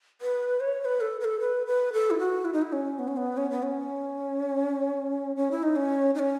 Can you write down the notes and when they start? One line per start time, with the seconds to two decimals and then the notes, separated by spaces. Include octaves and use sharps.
0.21 B4
0.60 C#5
0.81 C#5
0.85 B4
1.01 A4
1.20 B4
1.24 A4
1.40 B4
1.67 B4
1.93 A4
2.10 E4
2.19 F#4
2.45 E4
2.53 D#4
2.62 E4
2.72 C#4
2.99 B3
3.08 C#4
3.17 B3
3.37 C#4
3.50 B3
3.63 C#4
5.36 C#4
5.51 E4
5.63 D#4
5.76 C#4
6.15 D#4
6.19 C#4